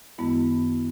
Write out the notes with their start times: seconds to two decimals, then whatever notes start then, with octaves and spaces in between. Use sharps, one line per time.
0.18 F#2 D#3 G#3 B3 E4